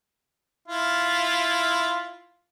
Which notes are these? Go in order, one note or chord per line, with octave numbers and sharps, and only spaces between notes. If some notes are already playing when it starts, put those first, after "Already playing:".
E4 F4